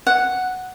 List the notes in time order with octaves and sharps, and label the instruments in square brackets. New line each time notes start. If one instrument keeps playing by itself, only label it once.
[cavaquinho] F#5